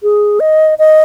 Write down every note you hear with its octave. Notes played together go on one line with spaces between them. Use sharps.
G#4
D#5
D#5